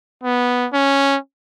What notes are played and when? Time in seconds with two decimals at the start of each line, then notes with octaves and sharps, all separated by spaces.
0.24 B3
0.73 C#4